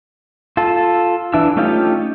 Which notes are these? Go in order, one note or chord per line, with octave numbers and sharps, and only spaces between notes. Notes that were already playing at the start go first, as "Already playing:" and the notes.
F4 A4
E3 D4 E4 E6
A3 C#4 D#4 F4 G4